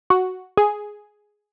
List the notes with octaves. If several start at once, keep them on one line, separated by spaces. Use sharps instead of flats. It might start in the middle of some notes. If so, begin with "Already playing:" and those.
F#4
G#4